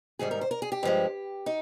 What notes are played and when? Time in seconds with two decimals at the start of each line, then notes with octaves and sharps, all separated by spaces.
0.19 G#2 D#3 G3 G#4
0.31 A#4
0.41 C5
0.51 A#4
0.62 G#4
0.72 G4
0.83 G2 F3 G#3
1.46 D#4